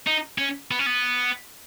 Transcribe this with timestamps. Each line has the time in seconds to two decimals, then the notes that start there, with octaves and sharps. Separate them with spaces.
0.07 D#4
0.38 C#4
0.71 B3
0.79 C#4
0.86 B3